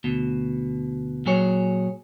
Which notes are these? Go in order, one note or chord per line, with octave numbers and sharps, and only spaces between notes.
D2 B2
A#2 F#3 G#4 C#5